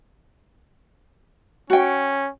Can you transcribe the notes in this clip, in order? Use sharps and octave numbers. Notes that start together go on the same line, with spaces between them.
C#4 F#4 G5